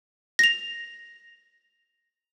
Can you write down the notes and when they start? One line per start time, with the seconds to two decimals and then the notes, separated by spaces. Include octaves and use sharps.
0.39 A#6 F7